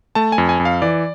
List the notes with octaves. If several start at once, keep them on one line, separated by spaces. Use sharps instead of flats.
A3 A5
G#5
F2
G#5
F2
F5
E3 D5